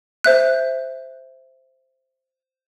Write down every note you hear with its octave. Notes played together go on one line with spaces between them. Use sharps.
C5 E5 F#6